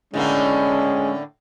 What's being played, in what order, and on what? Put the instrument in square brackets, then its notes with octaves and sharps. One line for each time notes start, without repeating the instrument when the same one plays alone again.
[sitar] A2 D3 A#3 [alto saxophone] G#3 [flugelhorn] C#4